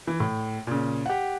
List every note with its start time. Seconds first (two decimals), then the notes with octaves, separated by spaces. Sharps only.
0.07 E3
0.20 A2
0.67 A#2 C#3
1.06 G4 F#5